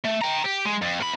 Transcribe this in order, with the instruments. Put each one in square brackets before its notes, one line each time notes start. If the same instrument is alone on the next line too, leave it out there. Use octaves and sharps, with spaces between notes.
[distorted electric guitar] A3
G5 A#5
G4
G#3
F2
E2 B5